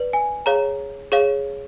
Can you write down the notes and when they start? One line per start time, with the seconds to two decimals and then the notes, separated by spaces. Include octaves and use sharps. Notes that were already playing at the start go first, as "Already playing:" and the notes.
Already playing: B4 D5
0.13 G#5
0.46 G#4 C#5 F5 A#5
1.12 G#4 C#5 F5